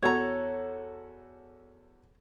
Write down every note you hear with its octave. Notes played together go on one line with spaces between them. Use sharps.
E2 F#4 A4 C#5 A#5